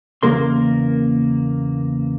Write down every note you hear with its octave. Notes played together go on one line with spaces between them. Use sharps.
E2 C#3 A#3 A#4 C6